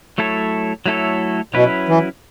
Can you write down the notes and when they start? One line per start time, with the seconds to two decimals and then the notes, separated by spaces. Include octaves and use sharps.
0.18 F#3 A3 E4 A4 C#5
0.86 F#3 A3 E4 A4 C#5
1.54 B2 F#3 C#4 E4 B4
1.88 E3